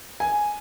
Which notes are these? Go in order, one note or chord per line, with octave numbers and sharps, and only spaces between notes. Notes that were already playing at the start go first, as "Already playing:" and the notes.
G#5